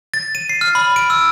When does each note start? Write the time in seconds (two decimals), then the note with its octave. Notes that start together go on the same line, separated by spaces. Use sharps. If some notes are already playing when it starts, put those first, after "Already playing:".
0.14 A6
0.35 D#7
0.49 C7
0.61 F6
0.75 B5
0.96 D7
1.10 E6